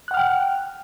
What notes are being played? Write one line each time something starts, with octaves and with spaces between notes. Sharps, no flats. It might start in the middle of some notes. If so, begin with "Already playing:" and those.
F#5 G5 F6 F#6